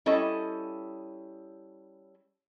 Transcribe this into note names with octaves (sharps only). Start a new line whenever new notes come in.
G3 C#4 E4 A4 D#5